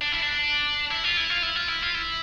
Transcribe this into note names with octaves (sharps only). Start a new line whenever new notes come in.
D4
E4
D4
E4
F4
E4
F4
E4
F4
E4
F4
E4